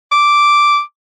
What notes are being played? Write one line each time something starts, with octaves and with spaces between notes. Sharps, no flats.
D6